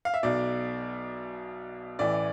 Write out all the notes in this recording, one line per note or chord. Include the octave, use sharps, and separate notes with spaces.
F5
E5
B1 B2 D5
A1 A2 E3 D5